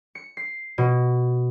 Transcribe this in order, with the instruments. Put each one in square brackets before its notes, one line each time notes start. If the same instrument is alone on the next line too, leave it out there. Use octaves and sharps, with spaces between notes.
[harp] C#7
C7
B2